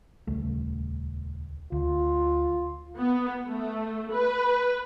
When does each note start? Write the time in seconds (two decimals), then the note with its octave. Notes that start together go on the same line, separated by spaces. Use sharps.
0.27 D#1 C#2 A3
1.72 D2 F4
2.97 B3
3.47 A3
4.12 B4